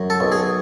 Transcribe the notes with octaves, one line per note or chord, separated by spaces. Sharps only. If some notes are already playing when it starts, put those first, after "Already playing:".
Already playing: F#2
A4
B1
G#4